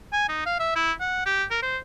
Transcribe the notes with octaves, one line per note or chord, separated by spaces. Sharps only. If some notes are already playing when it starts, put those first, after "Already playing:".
G#5
D#4
F5
E5
E4
F#5
G4
A#4
C5